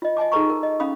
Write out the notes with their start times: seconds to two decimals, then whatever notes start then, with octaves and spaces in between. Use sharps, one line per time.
0.02 F4 D#5
0.17 D#5 G#5 A5 D6
0.32 D#4 G#4 A4 B4 A#5 C#6
0.50 A#4
0.63 D#5
0.80 C#4 F5 B5 D#6